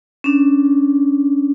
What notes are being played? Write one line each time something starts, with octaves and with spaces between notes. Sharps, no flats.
C#4 D4